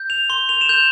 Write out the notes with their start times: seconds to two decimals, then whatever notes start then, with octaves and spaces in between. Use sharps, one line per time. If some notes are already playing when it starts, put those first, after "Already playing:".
Already playing: G6
0.10 F7
0.30 C6 G7
0.49 F7
0.61 E7
0.69 G6 F7